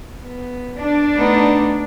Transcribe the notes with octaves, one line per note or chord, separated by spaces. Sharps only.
B3
D4
A3 B3 D#4